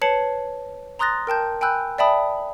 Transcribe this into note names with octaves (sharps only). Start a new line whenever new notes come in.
B4 C#5 A5 C7 C#7 F#7
A#5 C6 D#6 F#6 A6 A#6
A#4 G5 A5 G6
G5 G#5 B5 E6 F#6 G6
D5 E5 G5 A5 B5 D#6